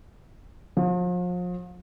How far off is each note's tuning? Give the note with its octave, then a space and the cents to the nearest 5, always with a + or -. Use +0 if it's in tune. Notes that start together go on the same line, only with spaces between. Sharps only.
F3 +40